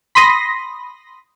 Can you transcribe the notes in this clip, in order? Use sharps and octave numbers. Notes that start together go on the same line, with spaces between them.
B5 C6 D#6 A#6